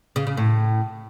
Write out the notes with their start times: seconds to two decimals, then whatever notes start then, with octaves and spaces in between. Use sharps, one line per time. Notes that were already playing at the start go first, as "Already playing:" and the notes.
0.16 C#3
0.27 C#3
0.37 A2